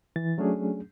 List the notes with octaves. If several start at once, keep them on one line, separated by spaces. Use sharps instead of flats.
E3 A6
F#3 A3 C#4 D4 G#4